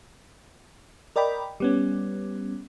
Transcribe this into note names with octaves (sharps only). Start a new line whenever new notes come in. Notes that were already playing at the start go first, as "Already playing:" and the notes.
A#4 D5 D#5 G5 B5
G3 B3 C#4